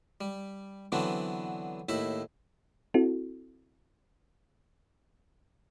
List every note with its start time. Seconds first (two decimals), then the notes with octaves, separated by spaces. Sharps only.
0.21 G3
0.92 D3 E3 F#3 B3 C4 D4
1.89 D#2 A2 E4 E5
2.94 C4 E4 F#4 A4